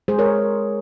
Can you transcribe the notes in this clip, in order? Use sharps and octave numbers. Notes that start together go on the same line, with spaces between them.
G#3 G#4 C5
A#4 C#5